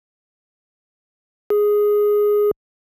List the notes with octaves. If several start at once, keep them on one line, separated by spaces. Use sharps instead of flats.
G#4